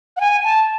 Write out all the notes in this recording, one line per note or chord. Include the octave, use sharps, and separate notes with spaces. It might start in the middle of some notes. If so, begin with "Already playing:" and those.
F#5
G#5
A5